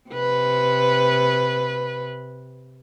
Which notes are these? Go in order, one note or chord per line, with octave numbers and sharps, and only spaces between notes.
C3 B4